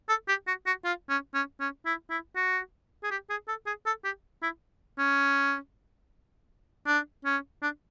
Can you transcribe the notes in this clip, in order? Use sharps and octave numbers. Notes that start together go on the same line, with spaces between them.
A4
G4
F#4
F#4
F4
C#4
C#4
C#4
E4
E4
F#4
G#4
G4
G#4
A4
G#4
A4
G4
E4
C#4
D4
C#4
D4